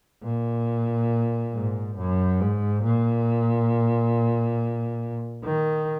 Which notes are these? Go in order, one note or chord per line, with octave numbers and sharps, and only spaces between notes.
A#2
G#2
F#2
G#2
A#2
D#3